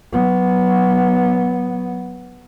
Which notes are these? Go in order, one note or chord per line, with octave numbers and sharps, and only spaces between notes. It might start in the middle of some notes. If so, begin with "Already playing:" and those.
F#3 B3